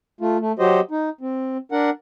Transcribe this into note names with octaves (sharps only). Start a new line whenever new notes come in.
A3 F4
A3
F#3 F#4 G4 C5 D#5
D#4
C4
D4 A#4 F#5